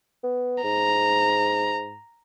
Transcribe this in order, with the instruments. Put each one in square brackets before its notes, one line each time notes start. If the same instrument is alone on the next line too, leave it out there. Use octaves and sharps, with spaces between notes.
[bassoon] B3
[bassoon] G#2 [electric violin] A#5